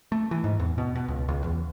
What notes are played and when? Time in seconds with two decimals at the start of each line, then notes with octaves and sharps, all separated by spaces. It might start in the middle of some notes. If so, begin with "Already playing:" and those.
0.12 A3
0.31 E3
0.44 G#2
0.60 E2
0.78 B2
0.95 B2
1.08 C#2
1.28 C#2
1.44 E2